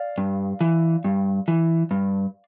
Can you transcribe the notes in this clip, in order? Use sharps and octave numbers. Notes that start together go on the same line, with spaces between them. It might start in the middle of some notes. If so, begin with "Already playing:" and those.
Already playing: D5 F5
G2
E3
G2
E3
G2